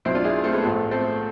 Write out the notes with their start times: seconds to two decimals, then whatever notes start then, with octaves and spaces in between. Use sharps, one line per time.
0.05 B1 B2 C4 E4
0.15 D4 F4
0.24 E4 G#4
0.44 A3 C4
0.53 G#3 B3
0.62 A1 A2 F3 A3
0.91 A3 C4